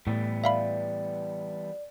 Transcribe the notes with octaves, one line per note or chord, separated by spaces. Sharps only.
A2 E3 G3 B3
D5 E5 F5 B5